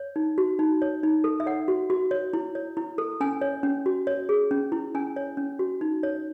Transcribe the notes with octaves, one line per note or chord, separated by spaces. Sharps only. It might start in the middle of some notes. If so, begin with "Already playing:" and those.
Already playing: C#5
D#4
F#4
D#4
C#5
D#4
A4
E5
C#5 F#5
F#4
F#4
C#5
E4
C#5
E4
A4
C#4 G#5
C#5
C#4
F#4
C#5
G#4
C#4
E4
C#4 G#5
C#5
C#4
F#4
D#4
C#5